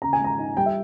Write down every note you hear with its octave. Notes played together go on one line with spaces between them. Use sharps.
C#3 A#5
G#5
G#3 A#5
D#4
G3 G5
E5